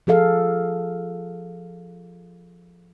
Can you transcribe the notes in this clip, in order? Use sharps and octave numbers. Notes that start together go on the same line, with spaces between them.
F3 G#4 A4 F5